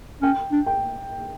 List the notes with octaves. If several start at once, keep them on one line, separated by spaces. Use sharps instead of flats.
C#4 G5
D4
G5